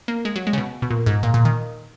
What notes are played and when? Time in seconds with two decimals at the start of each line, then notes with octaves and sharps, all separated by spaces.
0.08 A#3
0.25 G#3
0.36 F#3
0.47 G#3
0.53 C#3
0.58 B2
0.82 B2
0.90 A#2
1.06 G#2
1.23 A#2
1.34 A#2
1.45 D#3